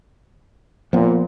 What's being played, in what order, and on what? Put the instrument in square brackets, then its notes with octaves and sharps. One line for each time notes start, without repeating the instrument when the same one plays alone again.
[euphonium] A#2 [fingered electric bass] F3 B3